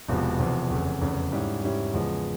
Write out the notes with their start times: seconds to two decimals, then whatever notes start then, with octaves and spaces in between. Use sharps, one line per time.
0.09 E1 E2 C3 F3
0.39 E1 E2 C3 F3
0.70 F1 E2 C#3
1.01 F1 E2 C#3
1.32 G#2 G3 C#4 E4 G4
1.63 G#2 G3 C#4 E4 G4
1.94 E2 C#3 F3 G#3